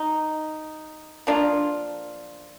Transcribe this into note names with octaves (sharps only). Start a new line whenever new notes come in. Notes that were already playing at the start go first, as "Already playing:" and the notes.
Already playing: D#4
F3 A#3 D4 F4